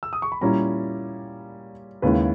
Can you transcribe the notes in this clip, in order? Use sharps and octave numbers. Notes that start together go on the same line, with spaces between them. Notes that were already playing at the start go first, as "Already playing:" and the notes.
E6
D#6
C#6
B5
A#2 G3 C#4 E4 A#5
D#2 C#3 G#3 C#4 E4 B4